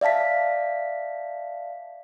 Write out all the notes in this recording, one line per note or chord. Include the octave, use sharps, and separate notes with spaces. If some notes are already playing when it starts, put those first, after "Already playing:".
D5 E5 F5 A5 B6